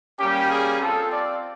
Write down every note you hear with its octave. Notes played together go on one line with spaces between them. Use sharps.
G3 A#3 C#4 G4
G#4
C4 F4 A4
D5